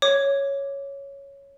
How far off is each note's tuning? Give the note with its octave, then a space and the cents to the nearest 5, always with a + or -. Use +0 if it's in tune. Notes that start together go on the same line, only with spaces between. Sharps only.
C#5 +0 D6 +0